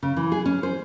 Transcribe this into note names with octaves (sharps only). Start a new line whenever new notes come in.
C#3
E3
G#4
C#4
C5